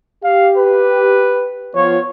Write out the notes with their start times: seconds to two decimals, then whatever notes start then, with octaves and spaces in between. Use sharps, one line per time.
0.24 G4 F5
0.57 B4
1.75 F3 B3 F4 C#5